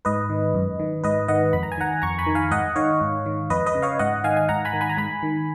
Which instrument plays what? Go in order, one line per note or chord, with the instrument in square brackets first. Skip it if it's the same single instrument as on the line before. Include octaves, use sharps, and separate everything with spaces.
[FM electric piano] G#2 B4 D#5
D#3
F#2
D#3
G#2 B4 D#5
D#3 D#5 F#5
F2 B5
A#5
G#5
D#3 F#5 A#5
F2 A#5 C#6
G#5 B5
D#3
F5 G#5
G#2 D#5 F#5
D#3 C#5 F5
G#2
D#3
F2 B4 D#5
B4 D#5
C#3
C#5 F5
G#2 D#5 F#5
D#3 F5 G#5
G#5
G#2 F#5 A#5
G#5 B5
D#3
G#5 B5
A#5
G#2 G#5 B5
D#3